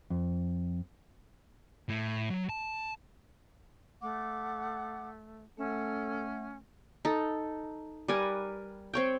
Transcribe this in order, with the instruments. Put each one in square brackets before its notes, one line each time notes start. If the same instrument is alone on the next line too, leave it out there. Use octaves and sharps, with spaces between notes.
[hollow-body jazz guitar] F2
[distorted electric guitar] A2
F#3
A5
[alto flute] A3 [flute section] F#5 D6
[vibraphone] A3 E5 F#5 [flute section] C#4 [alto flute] A4
[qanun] D#4 A4
G3 A#4 B4 G#5
C4 C#5 G5